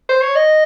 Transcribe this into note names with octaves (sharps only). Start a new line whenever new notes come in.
C5
C#5
D#5